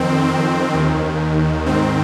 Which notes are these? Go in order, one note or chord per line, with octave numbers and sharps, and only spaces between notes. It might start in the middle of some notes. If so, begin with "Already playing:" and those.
Already playing: F2 D#3 C4
C4
D#2 D#3
G#2 D#3 C4